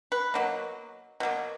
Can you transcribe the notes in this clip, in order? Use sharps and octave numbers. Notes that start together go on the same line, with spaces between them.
B4
B2 F#3 A#3
B2 F#3 A#3